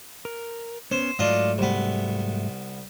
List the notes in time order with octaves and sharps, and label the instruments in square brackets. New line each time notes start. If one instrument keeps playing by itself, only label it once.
[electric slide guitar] A#4
[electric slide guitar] B3 C#4 [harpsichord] C5
[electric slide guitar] G#2 F#3 A3 [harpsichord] D4 F4 D#5
[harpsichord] C2 B3